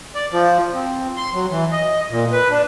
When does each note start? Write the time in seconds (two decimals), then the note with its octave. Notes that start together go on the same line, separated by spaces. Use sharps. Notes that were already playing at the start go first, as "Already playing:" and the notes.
0.15 D5
0.32 F3
0.74 C4
1.17 C6
1.34 F#3
1.50 E3
1.72 D#5
2.10 A#2
2.32 B4
2.50 D4